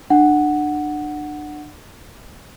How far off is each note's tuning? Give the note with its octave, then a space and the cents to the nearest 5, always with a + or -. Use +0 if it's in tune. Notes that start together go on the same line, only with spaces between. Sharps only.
D4 +30 F#5 +0